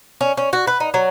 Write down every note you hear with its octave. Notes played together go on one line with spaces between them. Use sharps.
C#4
C#4
F#4
B4
D#4
F#3